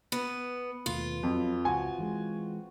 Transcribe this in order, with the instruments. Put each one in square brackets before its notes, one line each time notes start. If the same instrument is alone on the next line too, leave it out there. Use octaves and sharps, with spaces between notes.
[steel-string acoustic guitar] B3 [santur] B4
[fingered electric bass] D#2 B2 A3 [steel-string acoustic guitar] F4
[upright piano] F2 [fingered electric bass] F#3
[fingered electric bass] C#2 [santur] C4 F#4 [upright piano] G#5
[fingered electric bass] E3 G3 G#3